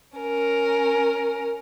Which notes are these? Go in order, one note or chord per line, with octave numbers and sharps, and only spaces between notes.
C#4 A#4